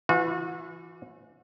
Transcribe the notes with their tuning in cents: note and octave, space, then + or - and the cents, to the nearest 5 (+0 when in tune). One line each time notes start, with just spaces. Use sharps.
E3 +20 F#4 -35